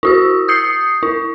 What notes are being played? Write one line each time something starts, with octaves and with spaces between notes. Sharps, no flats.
E4 F#4 E6
D#6 G6 C7 C#7
E4